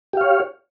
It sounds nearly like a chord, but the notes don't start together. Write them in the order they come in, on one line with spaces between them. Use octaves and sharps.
G4 F5 C#5